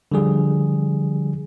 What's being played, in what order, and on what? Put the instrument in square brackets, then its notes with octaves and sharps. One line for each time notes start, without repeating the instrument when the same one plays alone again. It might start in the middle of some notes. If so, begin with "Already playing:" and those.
[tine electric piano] D3 F3 G3 G#4